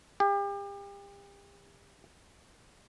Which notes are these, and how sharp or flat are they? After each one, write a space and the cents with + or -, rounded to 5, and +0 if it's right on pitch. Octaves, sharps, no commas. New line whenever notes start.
G4 +35